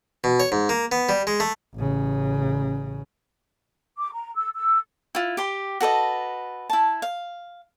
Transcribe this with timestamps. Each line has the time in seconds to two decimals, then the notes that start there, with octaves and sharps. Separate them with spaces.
0.24 B2
0.40 C#5
0.52 G#2
0.69 A#3
0.92 B3
1.09 G3
1.27 G#3
1.40 A3
1.75 A1 C#3
3.97 D6
4.13 A#5
4.35 E6
4.55 E6
5.15 E4 F4
5.37 G4 C6
5.80 F#4 A4 B4 D#5
6.70 E4 A5
7.02 F5